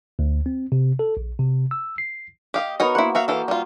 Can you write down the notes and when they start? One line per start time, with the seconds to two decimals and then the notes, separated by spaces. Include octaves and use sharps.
0.19 D2
0.46 C4
0.72 C3
0.99 A4
1.17 A#1
1.39 C3
1.71 E6
1.98 C7
2.54 G4 D#5 F5 D#6
2.80 B3 D#4 F#4 A#4 C#5
2.95 A#3 E4 C5 F#5
3.15 F#4 E5 F5
3.28 E3 A4 F5
3.48 G3 F4